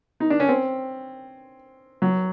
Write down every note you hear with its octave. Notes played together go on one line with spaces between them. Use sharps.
D#4
D4
C#4
C4
F#3